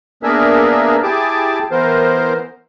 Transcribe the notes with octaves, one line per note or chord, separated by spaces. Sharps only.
A#3 B3 D4 G#4 A#4 E5
E4 G4 G#4 A5 D6
E3 B3 A#4 C5